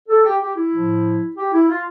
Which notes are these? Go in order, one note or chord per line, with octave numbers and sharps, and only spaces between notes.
A4
G4
G4
E4
A2 F3
G4
E4
F4